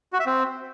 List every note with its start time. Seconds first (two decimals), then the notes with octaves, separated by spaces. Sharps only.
0.13 F#4
0.20 E5
0.26 C4